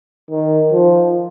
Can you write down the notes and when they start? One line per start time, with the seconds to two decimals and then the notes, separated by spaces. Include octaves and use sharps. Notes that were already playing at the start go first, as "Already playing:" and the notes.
0.31 D#3
0.72 F3